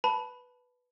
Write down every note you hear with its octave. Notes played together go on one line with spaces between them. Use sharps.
B4 A5 B5